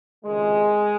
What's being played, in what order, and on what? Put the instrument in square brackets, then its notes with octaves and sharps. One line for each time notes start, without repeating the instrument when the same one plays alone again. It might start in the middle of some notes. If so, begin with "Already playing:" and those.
[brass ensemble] C#2 C3 D#3 G#3